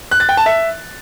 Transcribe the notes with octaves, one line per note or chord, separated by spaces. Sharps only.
F#6
A6
G5
A5
E5